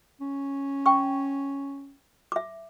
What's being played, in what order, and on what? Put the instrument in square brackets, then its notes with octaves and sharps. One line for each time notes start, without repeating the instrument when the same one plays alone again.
[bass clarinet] C#4
[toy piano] G5 C#6
E5 D6